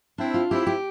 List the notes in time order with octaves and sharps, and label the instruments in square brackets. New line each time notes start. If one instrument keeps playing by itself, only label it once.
[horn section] C4 E4 [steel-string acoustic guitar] D4
[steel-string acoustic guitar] F4
[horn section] C4 E4 [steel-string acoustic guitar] G4
[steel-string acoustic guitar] G4